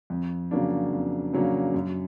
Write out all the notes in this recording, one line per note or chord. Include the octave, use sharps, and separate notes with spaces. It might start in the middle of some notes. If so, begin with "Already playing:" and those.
F2
C#3 F#3 A#3 D4
F2
C#3 F#3 A#3 D4
F#2